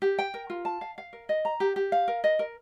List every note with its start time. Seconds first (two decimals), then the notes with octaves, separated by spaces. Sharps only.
0.02 G4
0.19 G5
0.34 A#4
0.50 F4
0.65 A5
0.81 F5
0.98 F5
1.13 A#4
1.29 D#5
1.45 A#5
1.60 G4
1.76 G4
1.92 F5
2.08 A#4
2.24 D#5
2.39 A#4